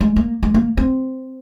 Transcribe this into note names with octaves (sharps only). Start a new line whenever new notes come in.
G#3
A#3
G#3
A#3
C4